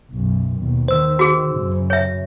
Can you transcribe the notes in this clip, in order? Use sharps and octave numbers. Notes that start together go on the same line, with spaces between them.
B1 F#2
D#2 B2
D#3 C5 E6
F#4 G#4
F#2 C#3
C#5 E5